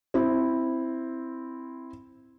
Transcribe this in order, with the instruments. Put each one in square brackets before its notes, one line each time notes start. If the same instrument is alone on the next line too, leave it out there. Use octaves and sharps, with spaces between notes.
[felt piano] C4 E4